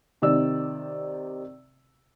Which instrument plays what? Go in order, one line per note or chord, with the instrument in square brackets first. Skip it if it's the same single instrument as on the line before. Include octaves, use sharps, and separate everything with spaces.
[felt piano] C3 D#3 D5 E6